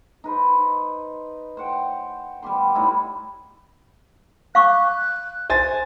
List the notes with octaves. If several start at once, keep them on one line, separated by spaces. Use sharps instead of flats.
D#4 B4 C5
C5 C#5 F#5 G5
G3 B3 G4 C6
A2 G3 D#4 E4
F5 C#6 D6 F#6
C5 G#5 A6